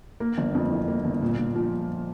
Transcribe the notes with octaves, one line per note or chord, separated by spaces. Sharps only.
A#3
G1
F2
E3
A#3
G1
A#2
A#2
F3